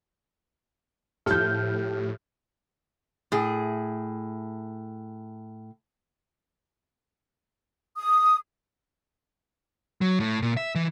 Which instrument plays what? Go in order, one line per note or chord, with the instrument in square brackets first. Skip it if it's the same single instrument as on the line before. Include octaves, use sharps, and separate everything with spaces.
[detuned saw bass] A2 [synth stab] F3 E4 A4 [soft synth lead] G4 [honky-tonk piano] F6 G6
[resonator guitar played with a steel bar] A2 G#4
[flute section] D#6
[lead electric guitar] F#3
A2
A#2
E5
E3